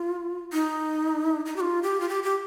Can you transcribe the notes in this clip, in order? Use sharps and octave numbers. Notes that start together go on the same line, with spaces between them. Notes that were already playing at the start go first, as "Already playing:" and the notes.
Already playing: F4
D#4
D#4
G4
F4
G4
F4
G4
G4